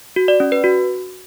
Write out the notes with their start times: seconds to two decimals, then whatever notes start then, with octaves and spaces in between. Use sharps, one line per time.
0.16 F#4
0.28 D5
0.40 C#4
0.52 B4
0.64 F#4